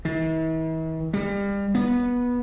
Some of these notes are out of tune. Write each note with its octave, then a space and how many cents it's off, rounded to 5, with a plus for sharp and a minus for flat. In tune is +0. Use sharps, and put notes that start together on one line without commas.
E3 -45
G3 +30
B3 -15